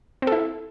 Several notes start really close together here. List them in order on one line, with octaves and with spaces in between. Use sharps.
C4 A4 E4